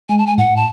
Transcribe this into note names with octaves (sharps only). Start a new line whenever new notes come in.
G#3 G#5
A5
G#5
A2 F#5
A5